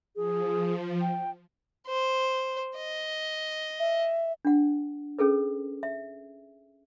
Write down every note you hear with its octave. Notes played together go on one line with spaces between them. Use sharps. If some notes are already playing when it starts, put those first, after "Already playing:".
F3 G#4
G5
C5
D#5
E5
D4 F#5
C#4 G#4 A4 B4
E5